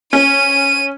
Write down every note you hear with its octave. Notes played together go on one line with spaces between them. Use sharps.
C#4 D#7